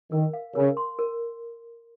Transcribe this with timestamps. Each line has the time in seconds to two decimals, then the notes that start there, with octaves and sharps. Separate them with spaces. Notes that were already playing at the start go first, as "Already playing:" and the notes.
0.12 D#3 A#4
0.33 F5
0.55 C#3 A#4
0.77 C6
0.99 A#4